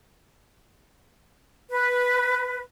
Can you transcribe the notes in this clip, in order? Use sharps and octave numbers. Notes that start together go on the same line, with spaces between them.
B4